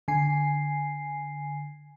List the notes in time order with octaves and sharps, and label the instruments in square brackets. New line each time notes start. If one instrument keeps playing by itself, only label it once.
[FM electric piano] D3 G#5 C7